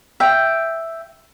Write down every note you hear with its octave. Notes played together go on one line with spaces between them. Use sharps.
E5 G5